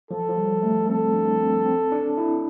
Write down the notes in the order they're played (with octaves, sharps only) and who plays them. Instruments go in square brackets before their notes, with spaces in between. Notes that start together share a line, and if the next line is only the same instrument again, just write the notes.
[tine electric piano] F3 [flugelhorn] A4
[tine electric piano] F3
G3
A3
[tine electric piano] C4 [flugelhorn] A4
[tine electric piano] D4
C4
C4
D4
E4